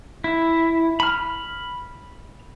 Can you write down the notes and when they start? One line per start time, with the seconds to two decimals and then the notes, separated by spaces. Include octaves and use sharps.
0.24 E4
1.00 B5 F6